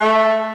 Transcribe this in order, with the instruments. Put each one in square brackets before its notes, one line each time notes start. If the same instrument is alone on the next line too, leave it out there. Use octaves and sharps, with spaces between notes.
[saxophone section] A3